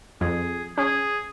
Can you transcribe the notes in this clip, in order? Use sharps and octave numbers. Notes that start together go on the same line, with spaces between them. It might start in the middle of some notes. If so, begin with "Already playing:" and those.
F2 G#4
C#4 G#4